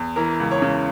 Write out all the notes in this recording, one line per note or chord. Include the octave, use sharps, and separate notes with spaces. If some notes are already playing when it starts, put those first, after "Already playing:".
Already playing: E2
E3 A#4
C#2
C#5
C#3